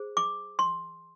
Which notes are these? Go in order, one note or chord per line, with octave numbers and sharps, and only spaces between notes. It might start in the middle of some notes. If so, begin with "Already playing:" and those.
Already playing: G#4 C5
D6
C6